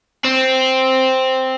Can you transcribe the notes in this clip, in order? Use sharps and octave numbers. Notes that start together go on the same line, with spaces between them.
C4